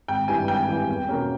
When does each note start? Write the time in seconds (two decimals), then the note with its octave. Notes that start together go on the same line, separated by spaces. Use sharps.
0.08 G#1 G5
0.28 G2 E3 G#5
0.48 G#1 G5
0.68 G2 E3
0.89 E2
1.09 B2 A#3 C#4